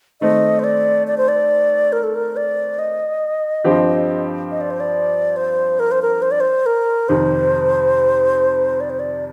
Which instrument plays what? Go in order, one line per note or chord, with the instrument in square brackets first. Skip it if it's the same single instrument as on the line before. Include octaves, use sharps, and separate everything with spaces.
[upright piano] D#3 A3 C4 [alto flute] D#5
[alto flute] C5
D5
D5
C5
D5
A#4
A4
A#4
D5
D#5
[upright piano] G2 F3 C4 G4
[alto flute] D#5
D5
C5
D5
C5
A#4
C5
A#4
C5
D5
C5
A#4
[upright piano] F2 C3 D#3 [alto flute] C5
[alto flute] D5
C5
D5